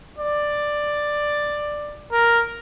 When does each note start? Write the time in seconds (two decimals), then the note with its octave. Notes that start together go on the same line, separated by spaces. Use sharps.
0.18 D5
2.12 A#4